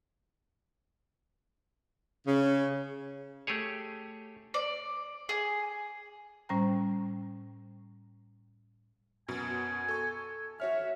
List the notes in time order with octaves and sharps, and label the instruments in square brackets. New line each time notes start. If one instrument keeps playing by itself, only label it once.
[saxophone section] C#3
[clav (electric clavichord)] A3 G4 G#4 C#5
[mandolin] D5
G#4
[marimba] A2 G3 C#4 C5 G5 A#5
[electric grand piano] F#2 B2 [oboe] G#5
[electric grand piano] A4 C#6
[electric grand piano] F#4 C#5 F6 [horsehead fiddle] E5